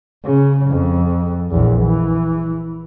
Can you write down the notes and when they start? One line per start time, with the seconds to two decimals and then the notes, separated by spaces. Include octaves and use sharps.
0.24 C#3
0.70 F2
1.51 A#1 E2
1.82 E3